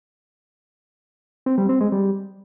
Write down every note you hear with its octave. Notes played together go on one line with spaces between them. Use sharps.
C4
G3
C4
G#3
G3